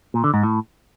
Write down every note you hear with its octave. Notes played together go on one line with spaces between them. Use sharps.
A#2
D3
G#2
A2